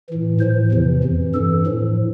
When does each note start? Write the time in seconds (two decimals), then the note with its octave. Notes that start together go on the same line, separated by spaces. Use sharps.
0.09 A2 E3
0.40 A2 F3 C5
0.72 E2 C3 E3
1.03 F2 E3
1.34 G2 E3 A4
1.66 A2 F3